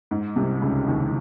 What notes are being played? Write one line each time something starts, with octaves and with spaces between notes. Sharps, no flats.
G#2
C2 C3
C#2 C#3
D#2 D#3